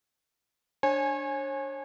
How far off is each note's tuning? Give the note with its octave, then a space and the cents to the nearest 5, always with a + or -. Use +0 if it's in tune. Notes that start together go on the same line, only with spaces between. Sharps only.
D4 +0 C#5 -35 G#5 +0